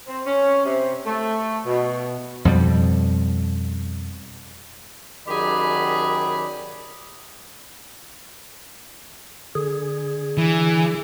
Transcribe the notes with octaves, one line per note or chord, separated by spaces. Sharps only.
C4
C#4
C3
A3
B2
F2 B2 G3
F#2 D#3 G4 G#4 D5 B5
D3 G#4
E3